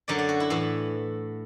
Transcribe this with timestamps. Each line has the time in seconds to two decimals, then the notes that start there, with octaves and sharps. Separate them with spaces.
0.08 F#2 D3 F#3 D5
0.19 D5
0.29 F#4
0.40 E4
0.50 A2 E3